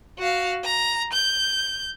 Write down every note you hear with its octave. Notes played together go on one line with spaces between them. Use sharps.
F#4 F5
A#5
G6